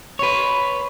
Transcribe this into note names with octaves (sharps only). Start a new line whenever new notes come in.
B4 C#5